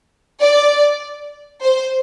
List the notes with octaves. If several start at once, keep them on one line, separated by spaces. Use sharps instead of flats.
D5
C5